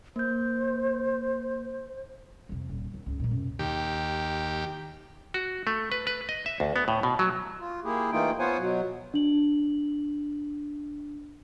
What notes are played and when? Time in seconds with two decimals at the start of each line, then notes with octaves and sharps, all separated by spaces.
0.16 A#3 C5 G6
2.49 F2 C3
2.69 D#1
2.94 D#2
3.06 C#2 G#2
3.20 A#2 A#3
3.31 F#2 C3
3.59 D#2 G4
5.34 F#4
5.67 A3
5.92 B4
6.07 B4
6.29 D#5
6.46 E5
6.60 D2
6.76 B3
6.88 A2
7.03 B2
7.19 F#3
7.59 F4
7.84 A#3 E4 G4 G#4
8.12 E3 A3 A#3 D#4 F4 G5
8.39 B3 F4 C5 C#5 F#5 G#5
8.58 B2 F#3
9.14 D4 F#7